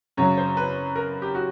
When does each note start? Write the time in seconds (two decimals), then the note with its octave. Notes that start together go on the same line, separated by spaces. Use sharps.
0.17 F#2 C#3 F#3 C#5
0.37 C5
0.57 B4
0.96 A#4
1.22 G4
1.35 F#4